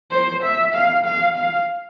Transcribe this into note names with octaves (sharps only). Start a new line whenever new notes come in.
C5
E5
F5
F5
F5